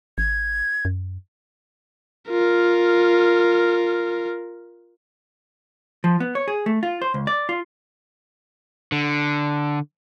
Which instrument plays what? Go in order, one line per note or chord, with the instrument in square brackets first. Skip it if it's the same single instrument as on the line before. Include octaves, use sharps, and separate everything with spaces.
[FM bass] G#1 [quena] G#6
[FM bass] F#2
[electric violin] F4 A#4
[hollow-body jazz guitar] F3
B3
C#5
G#4
A3
F4
C5
C#2
D5
F4
[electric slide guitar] D3